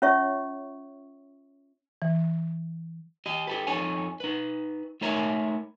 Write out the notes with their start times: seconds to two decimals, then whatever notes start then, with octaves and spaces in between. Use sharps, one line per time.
0.02 C#4 F4 C#5 E5 C#6
2.02 E3
3.26 G4 D#5
3.47 G4 A4 B4
3.67 F2 D#4 A4 C#5 G#5
4.20 D#4 B4
5.01 A3 D#4 A#4 C#5 E5 A#5